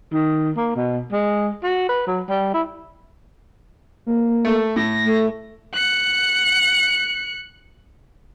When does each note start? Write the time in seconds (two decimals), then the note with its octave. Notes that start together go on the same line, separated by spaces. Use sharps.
0.13 D#3
0.56 A#3
0.76 B2
1.12 G#3
1.63 F#4
1.89 B4
2.07 F#3
2.29 G3
2.54 E4
4.06 A#3
4.45 A3 A4
4.76 A2 A#6
5.04 A3
5.75 F#6 C#7